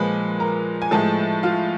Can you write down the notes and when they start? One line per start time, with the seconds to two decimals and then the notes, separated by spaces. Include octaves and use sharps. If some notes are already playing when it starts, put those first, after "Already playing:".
Already playing: A#2 F3 G#3 B4 B5
0.40 A#4 A#5
0.82 G#5
0.91 A2 F3 G#3 A4 A5
1.43 F4 F5